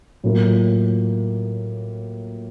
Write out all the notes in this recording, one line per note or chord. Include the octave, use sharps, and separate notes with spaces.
A2 F#3 A#3 F4